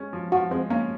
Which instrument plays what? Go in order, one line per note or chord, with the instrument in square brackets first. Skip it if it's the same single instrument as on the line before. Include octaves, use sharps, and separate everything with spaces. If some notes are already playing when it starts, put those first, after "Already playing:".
Already playing: [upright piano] G#3 C#4
F3
[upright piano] F3 [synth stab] F#4
[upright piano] G#3 [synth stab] C4
[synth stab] A#3 [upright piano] C#4